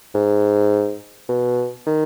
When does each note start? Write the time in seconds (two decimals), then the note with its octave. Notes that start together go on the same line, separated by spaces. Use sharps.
0.15 G#2
1.29 B2
1.86 D#3